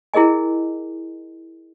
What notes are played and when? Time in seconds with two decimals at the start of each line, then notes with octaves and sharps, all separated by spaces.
0.14 E4 G#4 A#4 D#5 G#5